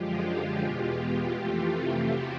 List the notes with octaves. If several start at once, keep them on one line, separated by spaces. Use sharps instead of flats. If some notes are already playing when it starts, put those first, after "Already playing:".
Already playing: F#2 D3 F3 G#3 F4 G4
E2 B2 G#3
F2 C3 E3 A3
E2 C3 E4 F#4